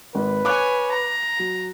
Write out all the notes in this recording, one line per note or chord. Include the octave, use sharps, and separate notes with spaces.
G#1 B4
C#5 G#5 D6 F#6
A#5
F#3